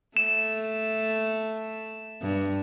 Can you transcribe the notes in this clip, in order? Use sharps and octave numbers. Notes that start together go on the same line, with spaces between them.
A3 E7
G2